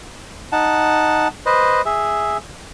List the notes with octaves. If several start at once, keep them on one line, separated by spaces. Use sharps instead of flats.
D#4 F#5 A5
B4 C5 D#5
G#4 E5